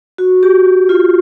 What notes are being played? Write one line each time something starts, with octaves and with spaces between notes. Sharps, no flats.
F#4
G4
F#4
F4